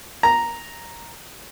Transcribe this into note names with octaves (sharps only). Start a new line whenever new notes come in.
A#5